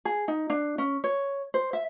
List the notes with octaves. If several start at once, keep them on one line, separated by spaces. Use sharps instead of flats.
G#4
D#4
D4
C#4
C#5
C5
E5